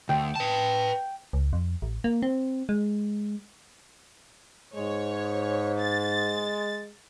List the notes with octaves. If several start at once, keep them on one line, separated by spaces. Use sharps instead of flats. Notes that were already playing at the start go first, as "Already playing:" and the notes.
D2 G5
B4 A5
C#2
F2
A1
A#3
C4
G#3
G#2 G#3 C#5
A6